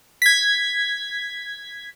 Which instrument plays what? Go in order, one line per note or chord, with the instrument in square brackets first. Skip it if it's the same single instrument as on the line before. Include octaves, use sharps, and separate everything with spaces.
[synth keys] G#6 B6